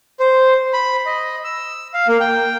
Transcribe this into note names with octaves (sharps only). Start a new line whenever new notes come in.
C5
B5
D#5
E6
F5
A#3
G5